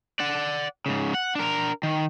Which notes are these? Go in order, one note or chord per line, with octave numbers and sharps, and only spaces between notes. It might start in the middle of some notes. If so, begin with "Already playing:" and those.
D5 F#5
G#2 C#3
F#5
D4 A#4
D#3